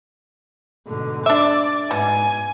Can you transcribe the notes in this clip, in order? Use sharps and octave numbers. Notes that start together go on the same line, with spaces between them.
G#2 B2 D3
D4 D5 E5 D6
G#2 B2 G#5